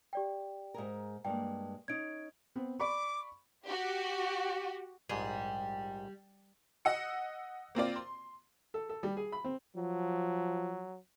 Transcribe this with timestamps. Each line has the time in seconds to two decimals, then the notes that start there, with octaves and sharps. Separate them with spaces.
0.13 G4 D5 G5
0.74 G#2 G#4 A#4
1.25 G2 G#3 A#3 G5
1.88 C#4 D#4 G#6 D7
2.56 B3 C4
2.80 D5 B5 C#6 D6
3.65 F#4 G4
5.09 A#1 G#2 G3 G#4
6.85 D#5 F#5 E6 C#7
7.75 A#3 C4 F4 D5
7.96 C6
8.74 A4
8.89 A4
9.03 G3
9.17 G#4
9.32 B5
9.44 C4
9.76 F3 F#3